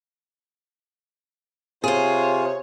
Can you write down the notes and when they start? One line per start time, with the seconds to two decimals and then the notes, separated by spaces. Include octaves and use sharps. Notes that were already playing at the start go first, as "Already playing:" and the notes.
1.84 C3 F4 G#4 C5 C#5